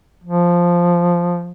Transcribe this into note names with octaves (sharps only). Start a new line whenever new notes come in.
F3